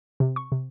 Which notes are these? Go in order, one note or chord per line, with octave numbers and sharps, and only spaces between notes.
C3
C#6
C3